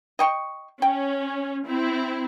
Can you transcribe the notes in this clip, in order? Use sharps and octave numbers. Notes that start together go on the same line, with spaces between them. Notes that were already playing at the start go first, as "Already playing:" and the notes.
D#5 G5 C#6
C#4 G5
C4 E4